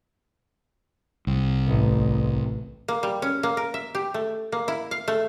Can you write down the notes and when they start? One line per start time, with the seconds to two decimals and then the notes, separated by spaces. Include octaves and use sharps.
1.27 C2
1.67 A1
2.88 A#3
3.03 G3
3.22 C#4
3.43 A#3
3.57 A#4
3.74 E5
3.95 G4
4.14 A3
4.52 A#3
4.68 E4
4.91 F5
5.08 A3